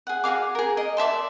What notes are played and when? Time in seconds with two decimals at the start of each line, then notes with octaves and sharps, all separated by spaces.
0.07 G#4 F#5
0.24 F#4 G#4 F5 D6
0.55 G#4 A#4
0.77 A#4 D#5
0.97 D5 E5 A5 C6